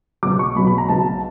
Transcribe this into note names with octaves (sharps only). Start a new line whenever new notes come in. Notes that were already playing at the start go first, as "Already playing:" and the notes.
B1 B2 F#3 D6
C#6
B1 B2 F#3 B5
B5
A#5
B1 B2 F#3 A5